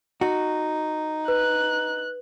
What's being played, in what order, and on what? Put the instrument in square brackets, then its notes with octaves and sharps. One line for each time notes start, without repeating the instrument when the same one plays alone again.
[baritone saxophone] D#4 [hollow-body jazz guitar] F#4
[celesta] B4 [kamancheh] F#6